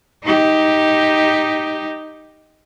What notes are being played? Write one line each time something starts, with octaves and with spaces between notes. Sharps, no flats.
D#4 G4